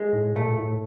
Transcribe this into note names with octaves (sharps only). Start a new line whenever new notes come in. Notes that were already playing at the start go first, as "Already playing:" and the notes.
Already playing: G#3
A2
A#2 A3
A2